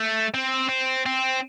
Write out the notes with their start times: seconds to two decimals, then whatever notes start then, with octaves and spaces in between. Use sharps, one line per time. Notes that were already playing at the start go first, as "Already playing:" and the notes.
Already playing: A3
0.34 C4
0.69 C4
1.06 C4